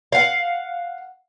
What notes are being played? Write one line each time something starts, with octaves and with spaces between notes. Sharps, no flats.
F5 F#5